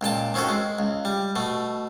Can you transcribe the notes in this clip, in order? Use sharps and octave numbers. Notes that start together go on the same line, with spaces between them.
C#2 A#2 G5 A5
D#3 C4 C#4 F#4 A4
G#3
C#2
G3
B2 A3